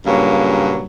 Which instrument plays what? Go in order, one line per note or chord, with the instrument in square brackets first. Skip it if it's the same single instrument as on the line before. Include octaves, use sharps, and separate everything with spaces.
[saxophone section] G2 A#2 C#3 F#3 A#3